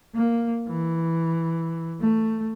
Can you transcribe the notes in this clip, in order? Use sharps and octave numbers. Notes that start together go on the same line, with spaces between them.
A#3
E3
A3